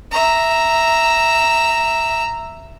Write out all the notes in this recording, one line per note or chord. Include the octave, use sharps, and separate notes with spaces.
E5 A#5